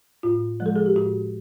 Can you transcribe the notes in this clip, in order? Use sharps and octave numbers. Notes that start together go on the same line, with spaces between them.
A2 F4
F3 G#3
A4
G#4
G4
A2 F#4